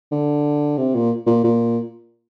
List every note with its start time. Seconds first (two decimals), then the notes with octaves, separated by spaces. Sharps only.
0.12 D3
0.78 C3
0.94 A#2
1.27 A#2
1.44 A#2